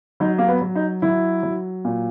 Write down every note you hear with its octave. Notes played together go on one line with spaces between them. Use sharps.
F#3 D#4
A#3
B3
F#3
D#4
F#3 E4
F#3
A#2